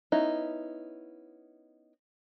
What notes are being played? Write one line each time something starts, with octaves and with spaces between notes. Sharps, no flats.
B3 C#4 D#4 E4